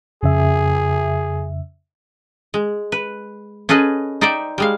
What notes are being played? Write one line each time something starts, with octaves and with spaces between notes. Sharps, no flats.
F2 C#3 G#4 E5
G#3
B4
C#4 G#4 A4 B4 D#5
D#4 C5 D5 E5 G5
G3 G#3 F5